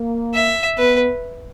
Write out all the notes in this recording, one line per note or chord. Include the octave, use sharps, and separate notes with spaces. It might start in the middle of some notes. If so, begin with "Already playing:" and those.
Already playing: A#3
E5
B3 B4